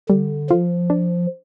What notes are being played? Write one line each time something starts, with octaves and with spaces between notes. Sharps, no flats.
D3 G3
F3 F4
D4